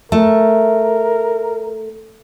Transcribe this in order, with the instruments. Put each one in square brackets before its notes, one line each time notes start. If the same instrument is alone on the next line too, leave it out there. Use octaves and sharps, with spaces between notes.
[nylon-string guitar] A3 [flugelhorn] A#4